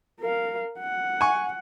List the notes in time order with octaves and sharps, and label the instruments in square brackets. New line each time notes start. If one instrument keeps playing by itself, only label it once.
[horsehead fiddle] A#4 F5
F#5
[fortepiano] G#5 C#6